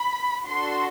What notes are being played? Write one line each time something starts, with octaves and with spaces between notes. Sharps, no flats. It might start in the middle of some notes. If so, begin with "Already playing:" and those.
Already playing: B5
D4 F#4 A4 C6